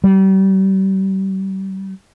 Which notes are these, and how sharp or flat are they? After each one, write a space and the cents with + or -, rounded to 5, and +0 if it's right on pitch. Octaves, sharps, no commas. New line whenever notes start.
G3 -35